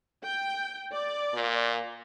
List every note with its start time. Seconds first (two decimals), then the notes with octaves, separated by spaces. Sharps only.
0.25 G5
0.94 D5
1.34 A#2